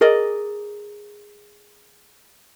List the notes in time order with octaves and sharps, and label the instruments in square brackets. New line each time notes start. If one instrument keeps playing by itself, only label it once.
[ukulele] G#4 A#4 D5 D#5